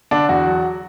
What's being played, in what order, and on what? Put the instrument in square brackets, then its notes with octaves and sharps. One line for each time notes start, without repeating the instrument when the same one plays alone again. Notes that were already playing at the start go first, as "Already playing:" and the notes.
[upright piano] D3 [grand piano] D4
[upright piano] E2 [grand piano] F#4
[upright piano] F#3